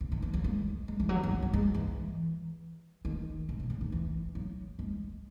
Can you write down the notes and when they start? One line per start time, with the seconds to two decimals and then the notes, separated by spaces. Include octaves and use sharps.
0.01 C#3
0.12 D#3
0.22 E3
0.33 F#3
0.44 G#3
0.88 G#3
1.00 E3
1.09 F#3
1.23 F#3
1.31 E3
1.42 F#3
1.53 G#3
1.74 E3
3.05 D#3
3.49 C#3
3.60 B2
3.70 C#3
3.81 D#3
3.92 E3
4.35 F#3
4.79 G#3